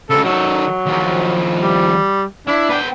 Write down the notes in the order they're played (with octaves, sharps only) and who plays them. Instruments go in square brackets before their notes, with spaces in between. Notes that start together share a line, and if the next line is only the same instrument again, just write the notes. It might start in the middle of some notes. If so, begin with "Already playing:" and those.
[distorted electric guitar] D2 C#3 [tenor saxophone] A4
[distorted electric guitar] D#3 A4 [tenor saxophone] F#3
[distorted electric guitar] D#2 F3
[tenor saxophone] G3
[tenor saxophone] D4 [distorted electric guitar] E4
[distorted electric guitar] B3 G5